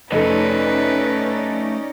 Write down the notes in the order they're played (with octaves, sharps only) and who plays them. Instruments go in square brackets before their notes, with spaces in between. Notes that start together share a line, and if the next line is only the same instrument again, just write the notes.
[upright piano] F1 A4 [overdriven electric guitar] A3 D#5 [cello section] C#4 D#4 D5 [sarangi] B4